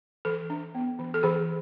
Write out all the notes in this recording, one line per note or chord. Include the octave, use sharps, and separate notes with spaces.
E3 A4
D4
B3
E3
A4
E3 G#4